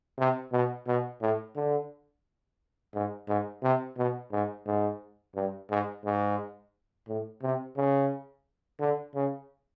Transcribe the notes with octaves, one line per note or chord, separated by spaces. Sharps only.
C3
B2
B2
A2
D3
G#2
G#2
C3
B2
G#2
G#2
G2
G#2
G#2
A2
C3
C#3
D3
C#3